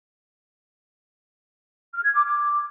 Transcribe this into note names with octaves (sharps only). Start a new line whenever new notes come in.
F6
G#6
D6
D6